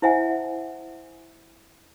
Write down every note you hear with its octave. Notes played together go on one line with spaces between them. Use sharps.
E4 C5 E5 F#5 G#5